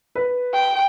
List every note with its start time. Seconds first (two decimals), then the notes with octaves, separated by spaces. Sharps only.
0.15 B4
0.53 G5